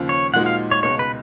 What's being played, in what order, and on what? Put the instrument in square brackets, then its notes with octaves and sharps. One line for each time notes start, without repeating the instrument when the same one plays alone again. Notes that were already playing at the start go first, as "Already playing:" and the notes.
Already playing: [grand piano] D#2 C#3 F3
[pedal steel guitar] C#5
[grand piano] A#2 F3 G#3 D#4 F#4 [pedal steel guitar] F#5
[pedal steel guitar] F5
C#5
[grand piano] C#2 B2 G#3 [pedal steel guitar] C#5
[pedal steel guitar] B4